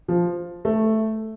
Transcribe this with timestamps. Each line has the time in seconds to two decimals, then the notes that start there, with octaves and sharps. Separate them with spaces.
0.08 F3
0.65 A3